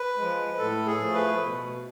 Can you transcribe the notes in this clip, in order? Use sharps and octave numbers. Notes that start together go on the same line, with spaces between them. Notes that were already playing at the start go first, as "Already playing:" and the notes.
Already playing: B4
G#3
F3
A2 A4
G#4
F3 A3
B4
B2